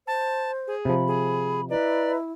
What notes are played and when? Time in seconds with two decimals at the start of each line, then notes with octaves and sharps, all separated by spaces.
0.07 C5 A5
0.67 G#4
0.85 C3 F3 B5
1.08 G#4
1.70 E4 B4 D5 D#5 A#5